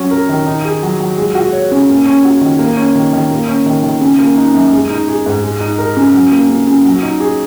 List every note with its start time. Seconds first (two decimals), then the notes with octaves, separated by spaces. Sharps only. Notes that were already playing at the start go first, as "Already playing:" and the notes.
Already playing: F#3 C#4
0.11 A#4
0.29 D#3
0.47 D#4
0.65 G#4
0.83 F#3
1.00 F#3
1.18 G#3
1.35 F#4
1.53 C#5
1.72 C#3
1.89 A#3
2.06 C#4
2.25 F#4
2.41 D#3
2.59 A#3
2.77 C#4
2.95 D#3
3.13 D#3
3.31 A#3
3.48 C#4
3.66 D#3
3.84 D#3
4.01 C#3
4.19 A#3
4.37 D#4
4.54 F#2
4.73 G#3
4.90 D#4
5.08 G#4
5.26 G#2
5.44 G#3
5.61 D#4
5.79 A#4
5.97 C#3
6.14 F#3
6.32 A#3
6.49 C#3
6.67 C#3
6.85 F#3
7.03 D#4
7.20 G#4